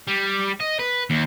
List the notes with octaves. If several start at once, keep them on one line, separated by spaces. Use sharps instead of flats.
G3
D#5
B4
D#2